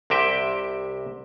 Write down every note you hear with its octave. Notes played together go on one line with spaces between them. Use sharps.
C2 C3 G4 E5 G5